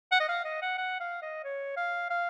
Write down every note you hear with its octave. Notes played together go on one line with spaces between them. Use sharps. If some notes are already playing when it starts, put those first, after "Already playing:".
F#5
D#5
F5
D#5
F#5
F#5
F5
D#5
C#5
F5
F5